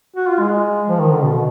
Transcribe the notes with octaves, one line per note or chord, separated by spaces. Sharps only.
F#4
F4
G#3
F3
D#3
D3
B2